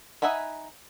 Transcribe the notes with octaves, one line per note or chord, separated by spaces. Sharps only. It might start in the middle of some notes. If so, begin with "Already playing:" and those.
D#4 E5 F#5 G#5 B5